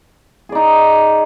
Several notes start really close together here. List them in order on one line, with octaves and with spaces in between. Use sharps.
G#4 D5 D#4